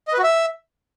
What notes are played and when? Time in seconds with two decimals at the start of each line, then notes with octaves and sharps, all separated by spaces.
0.08 D#5
0.13 B4
0.18 F#4
0.24 E5